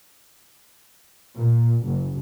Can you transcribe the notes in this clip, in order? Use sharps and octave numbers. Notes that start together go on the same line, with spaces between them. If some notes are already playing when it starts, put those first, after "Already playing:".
A#2
F#1